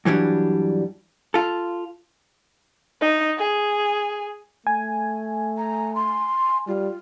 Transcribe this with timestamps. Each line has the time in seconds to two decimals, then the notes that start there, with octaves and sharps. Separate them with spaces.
0.05 G2 E3 F#3 G3 D4
1.34 F4 A4
3.01 D#4
3.38 G#4
4.67 A3 G#5
5.57 A#5
5.95 C6
6.67 G3 F4